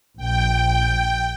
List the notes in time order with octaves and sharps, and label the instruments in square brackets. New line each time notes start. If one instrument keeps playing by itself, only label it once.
[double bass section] A#1 [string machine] G5